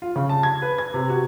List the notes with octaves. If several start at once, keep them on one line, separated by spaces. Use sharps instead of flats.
F4
C#3
A5
G#6
B4
G#6
C3
F#4